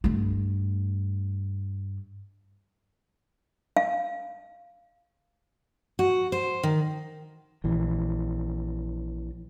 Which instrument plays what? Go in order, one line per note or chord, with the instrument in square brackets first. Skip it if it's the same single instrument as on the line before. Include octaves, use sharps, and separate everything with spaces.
[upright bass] G2 A3
[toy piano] F5
[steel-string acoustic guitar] F#4
C5
D#3
[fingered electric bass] A#1 E3